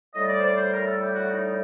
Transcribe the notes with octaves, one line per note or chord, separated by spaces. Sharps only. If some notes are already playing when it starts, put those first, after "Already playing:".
A2 G3 D#5
D5
C5
D5
C5
A#4
A4
G4
F#4
D#4
D#4